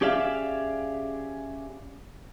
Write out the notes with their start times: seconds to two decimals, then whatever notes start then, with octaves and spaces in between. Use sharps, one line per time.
0.01 C#4 G4 G#4 D5 E5 F5